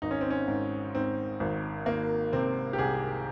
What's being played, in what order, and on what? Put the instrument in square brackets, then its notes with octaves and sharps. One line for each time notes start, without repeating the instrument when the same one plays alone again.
[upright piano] G#1 D#4
C#4
C4
C#4
G#2
G#2 C4
G#1
D#3 A#3
C3 C4
G4
C2 G#4